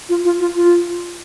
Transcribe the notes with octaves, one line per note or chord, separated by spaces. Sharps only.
F4
F4
F4
F4